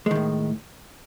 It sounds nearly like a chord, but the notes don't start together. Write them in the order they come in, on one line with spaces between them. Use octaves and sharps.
G#3 D#3 A2